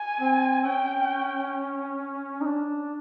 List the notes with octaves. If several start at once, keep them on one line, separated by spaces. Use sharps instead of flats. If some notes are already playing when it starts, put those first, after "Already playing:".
Already playing: G#5
C4
C#4 G5
D#4
D4